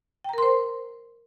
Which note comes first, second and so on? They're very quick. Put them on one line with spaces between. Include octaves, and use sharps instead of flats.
G5 A#5 A#4 C6 C5